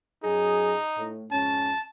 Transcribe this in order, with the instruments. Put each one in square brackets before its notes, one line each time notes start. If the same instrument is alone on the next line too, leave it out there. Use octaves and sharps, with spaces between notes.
[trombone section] F#2 F#3 G#4 [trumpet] D#4
[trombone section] A2
[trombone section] F2 G#2 C#4 [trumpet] A5